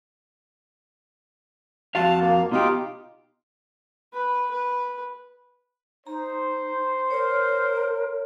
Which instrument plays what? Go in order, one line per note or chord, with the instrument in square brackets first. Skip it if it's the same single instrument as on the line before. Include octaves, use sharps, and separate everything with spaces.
[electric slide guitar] F2 F#4 F5 [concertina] A5
[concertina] A#3
[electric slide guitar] B2 G4 [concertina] D#4 F4
[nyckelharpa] B4
B4
[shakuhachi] D#4 [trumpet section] C5 [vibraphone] A#5
[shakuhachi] A#4 [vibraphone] C#5